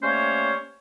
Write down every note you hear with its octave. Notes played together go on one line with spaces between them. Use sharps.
G3 A3 A#3 C#4 C5 C#5